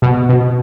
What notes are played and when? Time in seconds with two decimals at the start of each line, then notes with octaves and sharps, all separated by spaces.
0.02 B2
0.29 B2